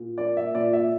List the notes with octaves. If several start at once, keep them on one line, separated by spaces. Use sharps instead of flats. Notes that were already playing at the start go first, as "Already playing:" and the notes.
Already playing: A#2
A#3 D5
E5
A#2 D5
E5